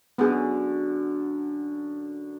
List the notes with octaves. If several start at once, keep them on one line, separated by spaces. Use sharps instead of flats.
F#2 D3 B3 G#4